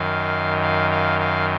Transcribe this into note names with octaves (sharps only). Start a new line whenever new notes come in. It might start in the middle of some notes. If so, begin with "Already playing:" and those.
Already playing: F#2 D#3 F5
F5
F5
F5